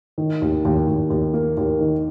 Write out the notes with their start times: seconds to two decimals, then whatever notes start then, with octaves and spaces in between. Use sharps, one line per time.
0.18 D#3
0.42 D#2
0.65 D#2
0.87 D#2
1.10 D#2
1.34 A#3
1.57 D#2
1.80 D#3